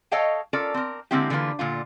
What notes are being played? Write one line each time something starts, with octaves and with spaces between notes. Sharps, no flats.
A4 C#5 D#5 F5 G5 A5
C#4 F4 A4 A#4 D5
C4 A#4
D3 G#3 A#3 C4 E4 G4
D3 E3 A#3 C4 F4 B4
A#2 D3 F4